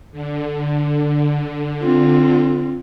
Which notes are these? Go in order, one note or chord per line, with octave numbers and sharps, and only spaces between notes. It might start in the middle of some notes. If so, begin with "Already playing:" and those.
D3
C4 F4